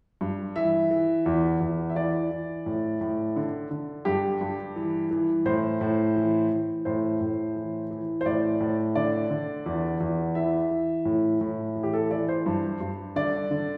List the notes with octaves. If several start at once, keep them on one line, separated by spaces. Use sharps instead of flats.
G2
E3 E5
E3
E2
E2
E5
E3 D5
E3
A2
A2
D3
D3
G2 G4
G2
E3
E3
A2 C5
A2
E3
E3
A2 C5
A2
E3
E3
C5
A2 D5
A2
D3 D5
D3
E2
E2
E3 E5
E3
A2
A2
E3
G4
A4
E3 D5
C5
G2
G2
D3 D5
D3